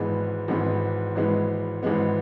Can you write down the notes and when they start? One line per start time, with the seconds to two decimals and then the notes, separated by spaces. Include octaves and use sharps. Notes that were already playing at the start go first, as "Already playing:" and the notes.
Already playing: G#1 G#2 E3 G#3 B3
0.48 G#1 G#2 E3 G#3 B3
1.15 G#1 G#2 E3 G#3 B3
1.83 G#1 G#2 E3 G#3 B3